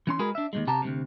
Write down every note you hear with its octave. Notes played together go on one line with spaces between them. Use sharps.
E3 C#4 C6
G#3 F#4 G#4 A#4 B4
D4 E5
D#2 G#2 G#3
C3 G4 A5 A#5
D2 G2 C3